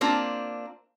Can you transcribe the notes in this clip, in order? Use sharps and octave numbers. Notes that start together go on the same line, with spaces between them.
A#3 C4 D4 F4